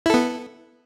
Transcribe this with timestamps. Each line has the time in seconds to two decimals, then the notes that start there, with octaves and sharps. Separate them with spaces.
0.06 E4
0.10 A4
0.14 B3